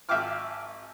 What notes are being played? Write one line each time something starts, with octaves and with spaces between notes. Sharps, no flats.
G#1 E5 F5 G5 D6 F6